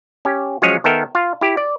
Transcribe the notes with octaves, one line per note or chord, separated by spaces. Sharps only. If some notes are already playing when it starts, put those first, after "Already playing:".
C#4 G4
F3 F#3 G#3 C#4 G#4 C#5
D#3 B3 A4 A#4 E5 G5
F4 F5
E4 G4
D5